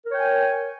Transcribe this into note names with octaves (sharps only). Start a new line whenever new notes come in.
A#4 C#5 G5 G#5